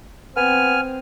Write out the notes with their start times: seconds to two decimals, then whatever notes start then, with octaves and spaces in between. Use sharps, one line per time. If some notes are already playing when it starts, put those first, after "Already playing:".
0.36 B3 C4 G#5 F6